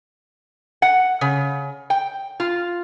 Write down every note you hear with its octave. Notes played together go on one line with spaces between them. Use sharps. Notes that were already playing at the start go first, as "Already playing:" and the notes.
F#5
C#3
G5
F4